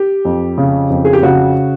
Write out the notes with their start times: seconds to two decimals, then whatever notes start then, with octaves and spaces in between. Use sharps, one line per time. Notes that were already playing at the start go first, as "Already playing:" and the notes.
Already playing: G4
0.25 F2
0.58 C#3
0.90 F2
1.05 G#4
1.13 G4
1.22 C#3 F#4